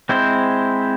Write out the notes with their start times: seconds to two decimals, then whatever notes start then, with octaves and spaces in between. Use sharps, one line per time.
0.09 G#3 C4 E4 C5